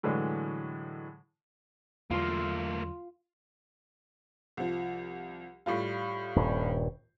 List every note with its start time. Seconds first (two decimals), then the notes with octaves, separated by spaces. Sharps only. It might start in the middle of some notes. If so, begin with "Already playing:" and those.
0.03 A2 D3 E3 F#3 G#3
2.11 E2 D3 F#3 A3 A#3 F4 C6
4.57 C2 F3
5.66 A2 G3 F4
6.36 D#1 G2